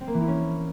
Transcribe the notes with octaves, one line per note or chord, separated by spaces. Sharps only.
C4
A#3
E3
E4
C#4